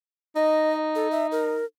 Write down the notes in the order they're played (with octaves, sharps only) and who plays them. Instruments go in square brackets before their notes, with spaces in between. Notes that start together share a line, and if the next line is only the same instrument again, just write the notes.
[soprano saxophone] D#4 [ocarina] D#5
[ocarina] A4
E5
A#4